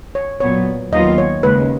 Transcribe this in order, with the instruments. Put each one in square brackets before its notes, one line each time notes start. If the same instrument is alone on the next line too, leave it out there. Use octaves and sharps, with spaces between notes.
[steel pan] C#5
[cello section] A#2 F#3 B3 [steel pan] C#5
[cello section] D#2 D#3 F#3 B3 F4 [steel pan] D#5
[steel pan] C#5
[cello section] D#2 C#3 G#3 [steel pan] B4